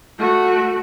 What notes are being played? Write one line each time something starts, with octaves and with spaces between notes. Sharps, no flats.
A3 F#4